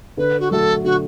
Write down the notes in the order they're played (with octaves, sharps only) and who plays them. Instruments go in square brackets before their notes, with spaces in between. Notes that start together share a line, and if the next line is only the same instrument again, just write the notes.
[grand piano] D3 [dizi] B4
[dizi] F#4
[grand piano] F#3 A3 F#4 [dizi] A4
[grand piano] D3 [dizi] F#4